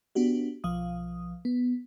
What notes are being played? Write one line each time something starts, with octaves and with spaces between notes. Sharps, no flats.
B3 D4 F#4 G4
B1 F3 F5 D#6
B3